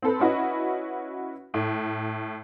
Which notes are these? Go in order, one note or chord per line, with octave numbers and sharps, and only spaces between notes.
C4 A4 B4
C#4 E4 F#4 B4 D#5
A2